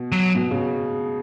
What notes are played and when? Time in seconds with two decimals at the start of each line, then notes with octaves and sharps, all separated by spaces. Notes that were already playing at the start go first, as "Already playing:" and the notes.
Already playing: B2
0.12 F#3
0.35 B2
0.51 C#3